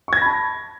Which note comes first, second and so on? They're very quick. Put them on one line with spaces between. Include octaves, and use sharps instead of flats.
C#6 G#6 A#6 B5 A5